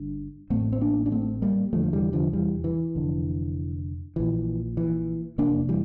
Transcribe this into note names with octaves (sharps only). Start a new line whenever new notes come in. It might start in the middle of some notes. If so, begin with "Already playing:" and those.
Already playing: G1 G2 D3
A1 A2 A3 C4
C4
A#3 D4
D4
A3 C4
G3 A#3
F1 E2 D3 F3 A3
F3
E3 G3
D3 F3
E3 G3
E3
F1 F2 D3
A#1 A#2 E3
E3
F1 E2 C3 A#3 D4
E3 G3